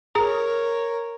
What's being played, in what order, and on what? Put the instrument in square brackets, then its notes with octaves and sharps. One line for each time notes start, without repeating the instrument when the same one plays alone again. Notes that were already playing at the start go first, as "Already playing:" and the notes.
[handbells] G#4 A#5 [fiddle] A#4 C#5